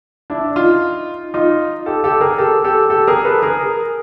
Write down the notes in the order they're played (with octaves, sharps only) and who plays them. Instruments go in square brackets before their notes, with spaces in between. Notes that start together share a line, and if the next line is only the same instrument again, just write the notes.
[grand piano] D4 E4
D#4 F4
D#4 F4
G4 A4
G4 A4
G#4 A#4
G4 A4
G4 A4
G4 A4
G#4 A#4
A4 B4
G#4 A#4